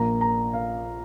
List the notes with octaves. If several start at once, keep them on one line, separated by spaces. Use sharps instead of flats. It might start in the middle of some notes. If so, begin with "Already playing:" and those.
Already playing: A#1 A#2 A#3 A#5
A#5
F5